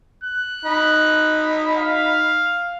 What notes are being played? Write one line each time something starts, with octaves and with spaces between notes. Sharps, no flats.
F#6
D#4 B5
F5